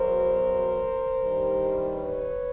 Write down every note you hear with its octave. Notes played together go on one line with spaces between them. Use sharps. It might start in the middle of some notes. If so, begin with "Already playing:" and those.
Already playing: E2 B2 F#3 A#4 C5
G2 D#3 G3
B4 C#5